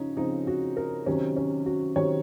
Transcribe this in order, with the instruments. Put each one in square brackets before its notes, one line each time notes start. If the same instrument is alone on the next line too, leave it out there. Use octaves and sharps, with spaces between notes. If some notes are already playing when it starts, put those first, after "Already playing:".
Already playing: [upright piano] C#3 F3 C#4 D#4
C#3 F3 C4 D#4
F#4
A#4
C3 D#3 F#3 C4 C#4
C#4
F#4
C3 D#3 F#3 C4 C#5